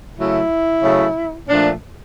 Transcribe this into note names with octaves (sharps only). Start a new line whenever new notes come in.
C#3 F#3 A3 E4
C#3 F#3 A3
A#2 F3 A3 D4